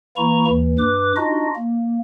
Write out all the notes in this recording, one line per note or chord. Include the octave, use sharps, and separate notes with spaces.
E3 A#3 E4 A#5 C#6
D#2 E3
G2 B4 D6
D4 D#4 F4 F#4 D#5
A#3